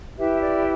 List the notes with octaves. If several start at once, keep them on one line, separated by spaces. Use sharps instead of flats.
E4 G4 B4 E5
D5